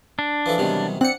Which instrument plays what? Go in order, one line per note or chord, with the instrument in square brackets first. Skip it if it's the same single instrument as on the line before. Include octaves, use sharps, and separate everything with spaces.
[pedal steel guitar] D4
[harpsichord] E3 F3 A4
[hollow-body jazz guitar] E2 G3 B3 [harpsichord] C3 D#3 F#3
[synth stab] C4 C#7 [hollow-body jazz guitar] D4 [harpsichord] F#5